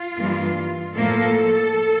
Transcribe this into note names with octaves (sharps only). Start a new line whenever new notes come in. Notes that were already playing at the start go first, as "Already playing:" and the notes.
Already playing: F4
G2 E3 A#3
A2 F3 A#3 A4